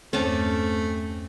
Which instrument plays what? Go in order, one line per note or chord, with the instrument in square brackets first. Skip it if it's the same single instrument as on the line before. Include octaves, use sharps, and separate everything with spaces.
[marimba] E2 G2 [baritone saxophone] A3 [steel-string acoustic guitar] C4 [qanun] C#4 A5 D6